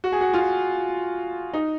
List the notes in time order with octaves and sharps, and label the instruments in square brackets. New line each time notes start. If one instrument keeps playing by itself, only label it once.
[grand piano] F#4
G#4
F#4
F4
D#4